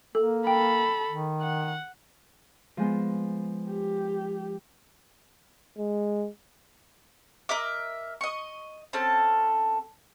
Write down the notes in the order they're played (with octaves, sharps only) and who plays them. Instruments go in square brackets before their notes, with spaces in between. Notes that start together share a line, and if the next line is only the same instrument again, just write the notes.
[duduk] A#3 [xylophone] A4
[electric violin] A4 B5 [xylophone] G5
[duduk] D#3
[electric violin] F#5
[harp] F3 G#3 B3
[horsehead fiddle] G4
[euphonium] G#3
[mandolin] A#4 D#5 E5 D6
D#5 C#6
C4 C#4 A4 A5